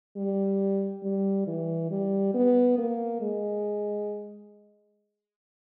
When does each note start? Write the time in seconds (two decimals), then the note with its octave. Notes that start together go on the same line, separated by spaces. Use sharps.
0.17 G3
1.04 G3
1.47 E3
1.91 G3
2.34 B3
2.78 A#3
3.21 G#3